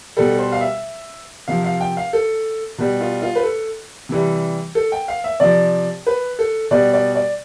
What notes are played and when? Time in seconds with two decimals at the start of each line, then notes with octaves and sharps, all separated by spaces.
0.17 B2 G3 A4
0.39 C5
0.52 F5
0.61 E5
1.48 C3 F3 F5
1.64 F5
1.81 G5
1.97 F5
2.13 A4
2.78 B2 G3
3.01 F4
3.22 F4
3.36 B4
3.44 A4
4.09 C3 E3 G3
4.75 A4
4.92 G5
5.08 F5
5.24 E5
5.40 C3 F3 D5
6.07 B4
6.39 A4
6.71 B2 G3 D5
6.93 D5
7.15 D5